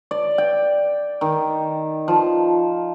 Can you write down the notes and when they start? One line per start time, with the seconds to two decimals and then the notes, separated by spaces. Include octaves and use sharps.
0.11 D5
0.38 G5
1.21 D#3
2.08 F3